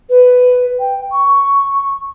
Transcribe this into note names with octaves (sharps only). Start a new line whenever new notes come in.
B4
G5
C#6